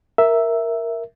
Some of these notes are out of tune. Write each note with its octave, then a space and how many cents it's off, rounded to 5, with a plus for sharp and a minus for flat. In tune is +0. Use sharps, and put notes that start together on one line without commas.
A#4 +0 E5 +0